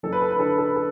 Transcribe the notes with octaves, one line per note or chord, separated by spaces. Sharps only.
F#1 A4
B4
A4
B4
D3 A4
B4
A4
B4
A4